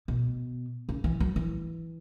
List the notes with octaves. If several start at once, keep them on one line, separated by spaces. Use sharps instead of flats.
B2
C#3
E3
F#3
E3